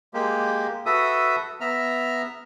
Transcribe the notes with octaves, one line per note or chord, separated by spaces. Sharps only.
G#3 A#3 G4
F#4 A4 B4 E5 D#6
B3 E5 A#5 F6